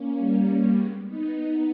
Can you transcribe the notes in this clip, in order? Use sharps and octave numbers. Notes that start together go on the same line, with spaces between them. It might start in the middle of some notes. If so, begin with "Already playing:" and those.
Already playing: A#3 C#4
G3 A#3
G#3 B3
B3 D#4